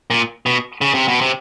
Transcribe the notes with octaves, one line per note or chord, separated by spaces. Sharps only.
A#2
B2
C#3
C3
B2
C3